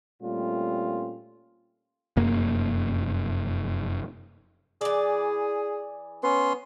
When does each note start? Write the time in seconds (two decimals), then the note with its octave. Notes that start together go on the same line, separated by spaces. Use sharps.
0.22 A#2 G3 A3 C4 C#4 F4
2.17 F1 F#2 A#3
4.81 E3 G#4 D5
6.23 B3 C#4 C6